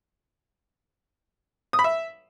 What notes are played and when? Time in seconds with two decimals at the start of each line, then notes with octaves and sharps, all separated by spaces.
1.73 D#6
1.79 B5
1.84 E5